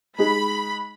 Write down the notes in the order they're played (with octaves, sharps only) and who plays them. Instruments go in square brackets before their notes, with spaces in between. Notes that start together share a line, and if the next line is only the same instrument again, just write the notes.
[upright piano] G#3 D#4 G#4 [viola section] B5